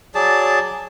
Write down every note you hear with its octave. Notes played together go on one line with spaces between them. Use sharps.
F#3 G#4 D5 A5